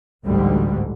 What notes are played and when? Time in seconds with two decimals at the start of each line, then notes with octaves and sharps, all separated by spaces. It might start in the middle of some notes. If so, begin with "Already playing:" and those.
0.23 A1 D2 G#2 D3 G3